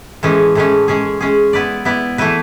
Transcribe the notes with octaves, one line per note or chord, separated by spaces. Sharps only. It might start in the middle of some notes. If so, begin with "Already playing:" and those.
A2 E3 G#3 C#4
A2 E3 G#3 C#4
G#3 C#4 G#4
G#3 C#4 G#4
B3 E4 B4 D5
B3 E4 B4 D5
E3 A3 E4 B4